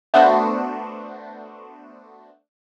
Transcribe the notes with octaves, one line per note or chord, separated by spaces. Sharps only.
A3 B3 D4 F#4 C5